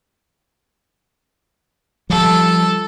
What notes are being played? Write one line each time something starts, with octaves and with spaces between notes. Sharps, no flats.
F3 G3 A4